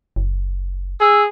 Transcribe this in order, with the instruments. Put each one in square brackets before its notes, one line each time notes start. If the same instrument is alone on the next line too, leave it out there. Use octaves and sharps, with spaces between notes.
[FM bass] F#1
[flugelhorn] G#4 [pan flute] E6